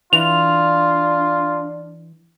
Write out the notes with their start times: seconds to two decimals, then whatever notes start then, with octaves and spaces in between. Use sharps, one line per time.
0.13 E3 D4 F4 F7